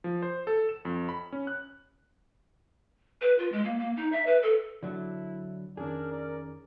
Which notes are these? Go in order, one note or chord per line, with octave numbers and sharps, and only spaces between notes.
F3
C5
A4
E7
F2
B5
C#4
F#6
B4
F4
G#3
A#3
A#3
D#4
E5
B4
A4
D3 F#3 D4 E4
F2 D#3 C#4 D4 G#4 A#4
D5